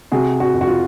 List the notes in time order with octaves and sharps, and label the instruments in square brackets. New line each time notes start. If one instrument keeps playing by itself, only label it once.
[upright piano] C3 F#4 G#4
F#4
F2
F#4
F4